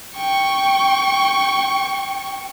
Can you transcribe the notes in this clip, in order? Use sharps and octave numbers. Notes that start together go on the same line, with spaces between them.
G5 C#6